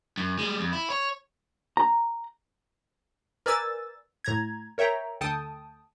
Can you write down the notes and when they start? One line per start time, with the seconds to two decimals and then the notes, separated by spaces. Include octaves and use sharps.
0.18 F#2
0.39 G3 G#3
0.59 F2
0.73 E4
0.90 C#5
1.77 A#5
3.46 A#4 B4 D5 G#5 E6 A6
4.24 A2 A#5 G#6
4.78 A#4 C#5 E5 G5 A#5
5.21 D2 A4 G5 A5 D#6